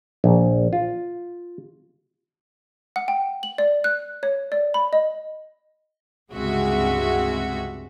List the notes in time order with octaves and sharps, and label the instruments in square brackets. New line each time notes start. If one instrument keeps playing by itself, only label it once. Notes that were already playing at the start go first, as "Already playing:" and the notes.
[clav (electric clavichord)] A#1
F4
[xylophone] F#5
G5
F#7
D5
F#6
C#5
D5
B5
D#5
[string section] C#2 G2 C3 G#3 F#4 E5